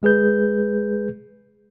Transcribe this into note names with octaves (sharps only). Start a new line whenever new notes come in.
G1 G#3 G#4 B4 G6